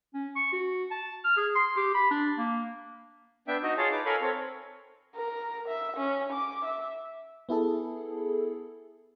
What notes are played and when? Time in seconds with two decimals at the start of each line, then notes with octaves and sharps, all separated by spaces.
0.14 C#4
0.36 C#6
0.53 F#4
0.91 A5
1.24 F6
1.37 G#4
1.55 C6
1.76 G4
1.94 B5
2.11 D4
2.38 A#3
3.48 B3 D4 E5 G5
3.63 D#4 F#4 D#5
3.78 F4 G#4 C#5 A5
3.92 D#4 B4 D6
4.06 A4 A#4 C#5 F5 G#5 B5
4.22 C4 A4 C#5
5.16 A#4
5.68 E5
5.97 C#4
6.33 D6
6.65 E5
7.49 B3 E4 G#4 A4